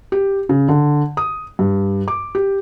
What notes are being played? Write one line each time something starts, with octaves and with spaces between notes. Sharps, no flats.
G4
C#3
D3
D#6
G2
D6
G4